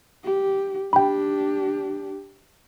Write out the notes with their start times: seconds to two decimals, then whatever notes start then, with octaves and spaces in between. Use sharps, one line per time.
0.24 G4
0.93 D4 G4 G5 B5